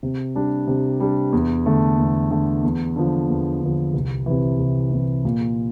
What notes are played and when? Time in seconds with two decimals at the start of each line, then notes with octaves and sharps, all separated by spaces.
0.03 C3
0.35 G3 D4
0.67 C3
1.00 G3 D4
1.32 E2
1.66 D3 A3
1.98 E2
2.31 D3 A3
2.63 E2
2.96 D3 F3
3.29 E2
3.61 D3 F3
3.94 C2
4.26 C3 E3
4.59 C2
4.92 C3 E3
5.25 A#2